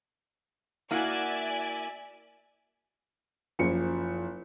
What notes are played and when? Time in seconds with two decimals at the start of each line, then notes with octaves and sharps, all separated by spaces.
0.91 A#3 E4 F#4 D5 E5 G#5
3.59 F#1 F3 C#7